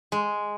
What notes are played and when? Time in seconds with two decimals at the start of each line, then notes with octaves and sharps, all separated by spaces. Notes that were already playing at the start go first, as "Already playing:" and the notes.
0.12 G#3